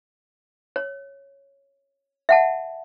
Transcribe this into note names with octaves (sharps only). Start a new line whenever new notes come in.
C#5
E5 F#5 A5